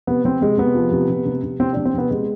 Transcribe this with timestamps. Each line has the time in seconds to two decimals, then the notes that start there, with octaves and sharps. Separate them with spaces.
0.07 C3 B3
0.25 C3 C4
0.42 C3 G#3
0.58 C3 B3
0.75 F3
0.92 C3
1.10 C3
1.26 C3
1.43 C3
1.60 C3 C4
1.73 C3 D4
1.85 C4
1.94 C3 B3
2.11 C3 G#3